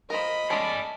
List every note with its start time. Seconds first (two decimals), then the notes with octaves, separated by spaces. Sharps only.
0.10 F3 A#4 D#5 B5
0.50 G#3 A3 C#4 G#4 D5 A5